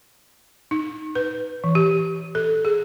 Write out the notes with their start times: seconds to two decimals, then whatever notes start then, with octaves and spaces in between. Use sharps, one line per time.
0.71 D#4
1.15 B4
1.64 E3
1.75 G4
2.35 A4
2.65 G#4